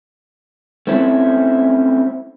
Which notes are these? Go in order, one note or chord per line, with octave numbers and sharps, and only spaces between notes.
A3 C4 C#4 E4